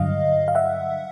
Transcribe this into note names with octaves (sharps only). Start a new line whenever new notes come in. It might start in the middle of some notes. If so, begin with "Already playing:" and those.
Already playing: G2 D3 F#3 D#5 F5
F5
E5 F#5